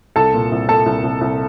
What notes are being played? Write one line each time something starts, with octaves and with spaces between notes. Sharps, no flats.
C2 A4 A5
A#2
C2
A#2 A4 A5
C2
C2
C2